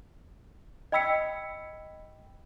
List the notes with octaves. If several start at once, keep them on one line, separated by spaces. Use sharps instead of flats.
D#5 G5 B5 E6 B6 C#7